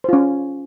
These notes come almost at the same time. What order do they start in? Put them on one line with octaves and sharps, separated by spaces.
C5 F4 C#4